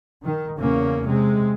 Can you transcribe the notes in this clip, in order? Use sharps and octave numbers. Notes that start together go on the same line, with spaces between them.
D#3
E2 C#3 A#3 C#4
C3 G#3